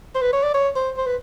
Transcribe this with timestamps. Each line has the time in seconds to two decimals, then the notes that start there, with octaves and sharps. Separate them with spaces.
0.15 C5
0.21 B4
0.32 C#5
0.43 D5
0.54 C#5
0.75 C5
0.97 C5
1.06 B4